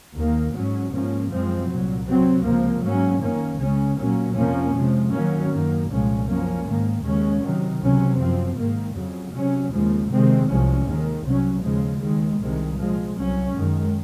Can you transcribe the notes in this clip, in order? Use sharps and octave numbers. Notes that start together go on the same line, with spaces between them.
D#2 D#3 A#3
G#2 F#3 C#4
G#2 F3 A#3 C#4
F#2 F3 G#3 C4
C2 A#2 F#3
C3 F#3 C4
C#2 C3 F3 A#3
G#2 F#3 A#3 C#4
F#2 D#3 A#3 C#4
C#2 C#3 G#3 C#4
A#2 F#3 A#3 C#4
F2 C3 F3 A#3 C#4
C3 F3 G#3
F#2 D#3 F#3 A#3 C#4
F#2 D#3 A#3
C2 A#2 F3 G#3 C#4
F#2 F3 A#3 C#4
G#2 D#3 A#3
D#2 C#3 G#3 C#4
C3 D#3 F#3
C#2 C3 F#3 C#4
F#2 F3 C4
G#2 D#3 A#3
F2 C#3 F#3
C3 F#3 C#4
D#2 C#3 F3 G#3
C3 D#3 G#3 C4
C2 C3 F3 G#3 C#4
D#2 D#3 G#3
C2 C3 F#3 C#4
D#2 C#3 F3 G#3
D#2 D#3 G#3
C2 C3 D#3 G#3
A#2 F3 G#3
C2 C3 F#3 C#4
F#2 D#3 G#3